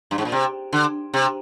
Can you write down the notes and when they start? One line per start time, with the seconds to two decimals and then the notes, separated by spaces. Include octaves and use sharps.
0.11 G2
0.18 G#2
0.25 A#2
0.32 C3
0.73 D3
1.14 C3